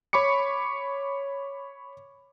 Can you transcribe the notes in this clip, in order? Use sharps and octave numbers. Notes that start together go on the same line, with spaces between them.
C#5 B5 C#6 D6 C#7